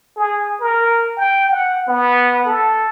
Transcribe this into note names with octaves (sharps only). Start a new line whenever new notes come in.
G#4
A#4
G5
F#5
B3
A4